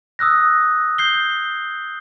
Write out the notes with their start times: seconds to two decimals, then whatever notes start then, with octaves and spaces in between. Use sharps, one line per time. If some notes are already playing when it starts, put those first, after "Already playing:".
0.19 D#6 E6 F#6 A#6
0.98 G6 C7 G7